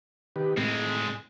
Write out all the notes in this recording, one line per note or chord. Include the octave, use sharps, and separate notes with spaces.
D#3 G4 B4
A2 G#3 C4